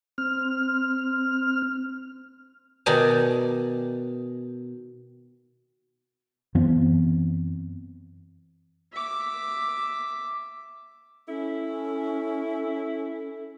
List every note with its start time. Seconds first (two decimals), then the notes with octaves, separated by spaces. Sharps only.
0.18 C4 F6
2.86 B2 D#3 D#4 D5 G#5 A5
6.55 F#2 E3 B3 C4
8.93 E5 D6
11.28 C#4 E4 A4